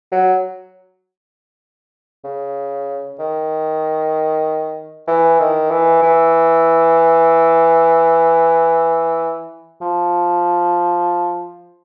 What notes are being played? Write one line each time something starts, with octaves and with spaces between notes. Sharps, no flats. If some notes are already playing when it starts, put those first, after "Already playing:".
F#3
C#3
D#3
E3
D#3
E3
E3
F3